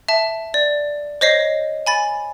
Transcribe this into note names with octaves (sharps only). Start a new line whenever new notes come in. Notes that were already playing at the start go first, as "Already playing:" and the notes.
E5 A5
D5
C5 C#5 D#5 A#6 C7
G#5 B5 A6